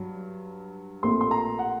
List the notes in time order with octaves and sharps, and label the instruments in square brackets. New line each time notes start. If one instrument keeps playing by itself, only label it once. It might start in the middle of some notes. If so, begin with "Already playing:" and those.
Already playing: [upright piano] G2 F#3
A#1 A#2 A3 C4 C6
C6
A#5
F#5